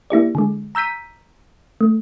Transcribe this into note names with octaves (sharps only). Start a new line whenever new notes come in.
A#3 E4 G4 D5
D3 G#3
A#5 E6 G6 B6 D#7
A3